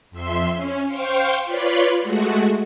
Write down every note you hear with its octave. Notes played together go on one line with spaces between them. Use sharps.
F2 E5 C6
C#4
C5 F5 G5 C6 C#6
F4 B4 C#5 D5 B5 C6
G#3 A3 F#4